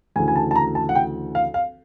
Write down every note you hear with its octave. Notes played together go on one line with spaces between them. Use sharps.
D2 C#3 E3 G#5
G#5
A5
A5
A#5
A5
F#5
G5
F5
F5